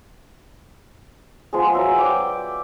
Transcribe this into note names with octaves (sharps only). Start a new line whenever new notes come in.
F3 G#3 B3 G#4
F#3 F#4 E5
D5 G5 D6